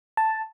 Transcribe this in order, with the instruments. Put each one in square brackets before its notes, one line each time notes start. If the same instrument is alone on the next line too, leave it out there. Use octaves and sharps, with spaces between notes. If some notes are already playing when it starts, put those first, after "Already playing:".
[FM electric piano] A5